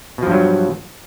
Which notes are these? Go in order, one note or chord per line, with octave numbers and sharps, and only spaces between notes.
G2 B2 F3 F#3